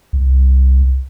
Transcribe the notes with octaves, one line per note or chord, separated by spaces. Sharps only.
C2